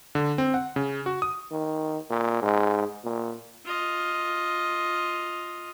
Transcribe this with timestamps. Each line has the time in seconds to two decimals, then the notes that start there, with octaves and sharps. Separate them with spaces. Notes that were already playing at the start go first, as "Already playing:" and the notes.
0.15 D3
0.38 C4
0.54 F#5
0.76 C#3
1.06 F#4
1.22 D#6
1.51 D#3
2.10 A#2
2.42 G#2
3.04 A#2
3.65 F4 D#5